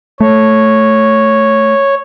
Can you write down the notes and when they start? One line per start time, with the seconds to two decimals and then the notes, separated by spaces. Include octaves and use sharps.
0.20 A3 C#5